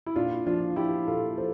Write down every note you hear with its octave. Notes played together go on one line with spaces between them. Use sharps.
E4
A#2 D4 F4
F3 D4 F4
F3 E4 G4
A#2 F4 A4
F3 A4 C5